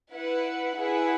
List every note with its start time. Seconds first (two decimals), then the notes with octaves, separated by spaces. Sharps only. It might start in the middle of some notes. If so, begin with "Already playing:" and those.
0.13 E4 B4 F#5
0.78 E4 G#4 B4 F#5